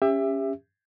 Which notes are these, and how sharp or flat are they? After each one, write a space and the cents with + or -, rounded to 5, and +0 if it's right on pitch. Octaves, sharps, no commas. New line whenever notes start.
C#4 +0 G4 +30 E5 +10